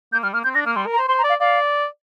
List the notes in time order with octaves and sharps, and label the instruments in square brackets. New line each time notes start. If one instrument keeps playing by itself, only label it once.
[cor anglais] A#3 [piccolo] G6
[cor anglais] G3 [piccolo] F6
[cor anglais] A#3 [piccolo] F6
[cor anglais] C4 [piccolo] G6
[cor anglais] D4 [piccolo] A#6
[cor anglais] A#3 [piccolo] F6
[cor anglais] G3 [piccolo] C6
[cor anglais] A#4
[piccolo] A#5
[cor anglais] C5
[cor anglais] C5 [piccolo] C6
[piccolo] A#5
[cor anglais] D5
[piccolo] F5
[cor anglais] D5 [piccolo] F5